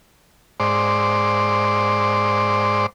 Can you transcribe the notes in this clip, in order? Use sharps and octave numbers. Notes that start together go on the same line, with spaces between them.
G#2 C5 D5